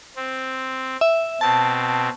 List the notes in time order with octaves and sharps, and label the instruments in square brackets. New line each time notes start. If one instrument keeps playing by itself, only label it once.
[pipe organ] C4
[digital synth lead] E5
[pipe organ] B2 C4 [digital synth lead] A5